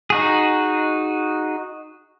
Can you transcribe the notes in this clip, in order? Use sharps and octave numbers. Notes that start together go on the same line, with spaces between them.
D#4 F#4 G#4